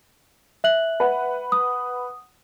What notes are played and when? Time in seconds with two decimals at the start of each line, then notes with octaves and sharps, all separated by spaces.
0.64 E5 F#6 F#7
1.00 B4 F#5
1.52 D#6